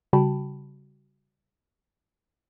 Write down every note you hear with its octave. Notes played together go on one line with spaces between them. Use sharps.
C#3 G3 F#4 G5 A5 B5